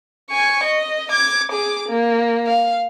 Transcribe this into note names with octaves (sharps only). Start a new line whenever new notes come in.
G#5 C#6
D#5
D6 G#6
G#4 D6
A#3
F5